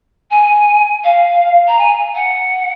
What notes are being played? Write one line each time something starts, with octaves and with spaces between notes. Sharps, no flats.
G#5
F5
A#5
G#5
F#5